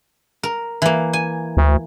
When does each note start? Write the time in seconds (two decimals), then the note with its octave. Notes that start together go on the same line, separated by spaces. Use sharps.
0.43 A#4
0.82 E3 A#3
1.13 G#5
1.57 D2